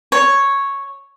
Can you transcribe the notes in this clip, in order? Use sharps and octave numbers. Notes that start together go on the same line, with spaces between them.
C#5